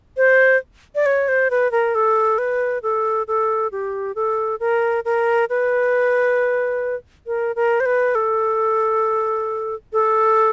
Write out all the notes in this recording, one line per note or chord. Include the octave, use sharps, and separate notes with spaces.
C5
D5
C#5
C5
B4
A#4
A4
B4
A4
A4
G4
A4
A#4
A#4
B4
A#4
A#4
C5
B4
A4
A4